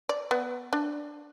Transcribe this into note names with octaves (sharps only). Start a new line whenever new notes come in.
D5
B3
D4